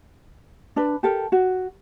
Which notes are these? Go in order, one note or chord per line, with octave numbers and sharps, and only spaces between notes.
D4 B4
G4 A4 A#4
F#4